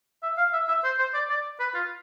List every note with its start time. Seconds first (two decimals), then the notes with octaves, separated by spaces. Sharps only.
0.23 E5
0.37 F5
0.53 E5
0.68 E5
0.84 C5
0.99 C5
1.14 D5
1.30 D5
1.60 B4
1.74 F4